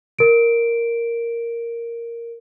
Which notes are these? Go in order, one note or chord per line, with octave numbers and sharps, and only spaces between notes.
A#4 D7